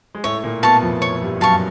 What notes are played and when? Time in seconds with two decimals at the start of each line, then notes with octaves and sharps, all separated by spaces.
0.15 G#3
0.24 A2 A3 C#5
0.44 A#2 A#3
0.63 B2 B3 F5 A5 C#6
0.82 F2 F3
1.02 C#5
1.22 G2 G3
1.41 F#2 F#3 F5 A5 C#6